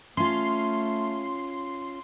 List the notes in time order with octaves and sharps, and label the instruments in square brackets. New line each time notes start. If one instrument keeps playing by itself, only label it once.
[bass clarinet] A3 [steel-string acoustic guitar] C#4 F4 [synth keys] C6